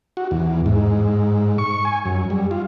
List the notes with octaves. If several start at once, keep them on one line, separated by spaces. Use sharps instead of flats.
F#4
E2
G#2
C#6
G#5
F#2
G3
F4